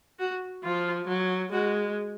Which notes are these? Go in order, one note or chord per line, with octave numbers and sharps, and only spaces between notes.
F#4
F3 F4
F#3
G#3 F#4